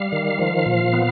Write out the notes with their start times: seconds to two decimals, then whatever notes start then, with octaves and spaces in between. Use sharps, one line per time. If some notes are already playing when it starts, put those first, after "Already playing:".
Already playing: G3 F5
0.12 D#3
0.39 F3
0.66 A#2
0.93 B3